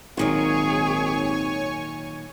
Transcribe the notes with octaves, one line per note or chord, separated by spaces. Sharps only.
G#1 A#2 D#3 F#3 G#4 C#5 G#5 C#6